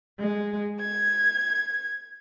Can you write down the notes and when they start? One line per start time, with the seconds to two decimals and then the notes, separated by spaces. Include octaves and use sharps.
0.21 G#3
0.81 G#6